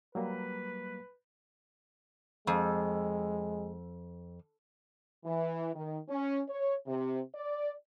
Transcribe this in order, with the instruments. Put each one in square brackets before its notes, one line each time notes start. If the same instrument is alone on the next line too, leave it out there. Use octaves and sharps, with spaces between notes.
[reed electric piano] F#3 G3 A#3 [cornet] B4
[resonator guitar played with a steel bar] F2 [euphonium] G#3
[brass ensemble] E3
D#3
C#4
C#5
C3
D5